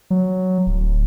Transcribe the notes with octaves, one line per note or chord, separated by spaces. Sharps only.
F#3
D1